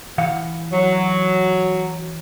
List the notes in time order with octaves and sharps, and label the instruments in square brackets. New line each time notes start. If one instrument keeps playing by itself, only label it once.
[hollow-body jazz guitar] E3 F5 F#5
[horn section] F#3